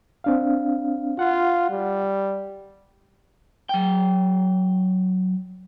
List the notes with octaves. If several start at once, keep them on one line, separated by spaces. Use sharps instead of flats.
C4 D4 F5
F4 F#5
G3
F#3 G5